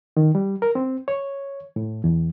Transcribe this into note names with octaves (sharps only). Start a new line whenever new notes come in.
D#3
G3
A#4
C4
C#5
A2
E2